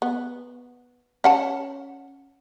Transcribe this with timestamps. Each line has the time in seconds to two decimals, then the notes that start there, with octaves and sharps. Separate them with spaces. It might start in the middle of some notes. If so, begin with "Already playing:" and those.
0.02 B3
1.24 C#4 F#5 A5